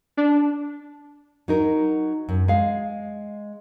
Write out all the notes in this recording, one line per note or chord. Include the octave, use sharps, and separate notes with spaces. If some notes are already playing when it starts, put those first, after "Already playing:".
D4
F#3 D#4 A#4
F#2
G#3 F5